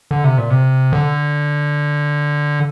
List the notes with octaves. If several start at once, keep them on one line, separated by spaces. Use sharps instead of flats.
D3
C3
A#2
C3
D3